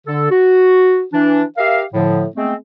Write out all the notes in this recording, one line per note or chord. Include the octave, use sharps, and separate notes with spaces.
D3 A4
F#4
E3 D4
G4 A#4 E5 F5
A2 D3 F3
G#3 A3 B3 C4